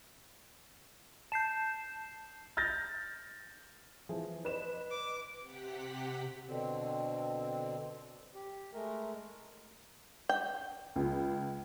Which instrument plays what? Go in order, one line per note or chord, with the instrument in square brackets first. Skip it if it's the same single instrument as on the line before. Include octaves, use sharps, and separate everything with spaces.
[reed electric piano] A5 [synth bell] G6 C7 E7
[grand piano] F6 G6 A6 A#6
[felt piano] E3 F3 G#4
[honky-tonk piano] B4 D#5 E7 [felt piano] C5 D5
[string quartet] D6
[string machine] C3 G4 F#5 B6
[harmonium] B2 D3 C4
G4
G#3 A3 A#4
[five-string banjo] G5
[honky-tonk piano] C#2